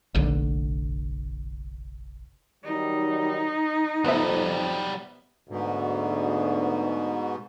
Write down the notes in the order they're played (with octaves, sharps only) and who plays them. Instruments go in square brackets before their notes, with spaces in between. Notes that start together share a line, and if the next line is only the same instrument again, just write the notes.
[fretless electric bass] F1 A#1 D3
[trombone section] D#3 F#3 G3 [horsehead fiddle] D#4
[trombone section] F2 [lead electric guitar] F#3 G3 [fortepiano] B3 C5 E5
[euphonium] D2 [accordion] G#2 B2